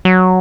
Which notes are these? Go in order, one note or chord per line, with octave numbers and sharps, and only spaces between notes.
F#3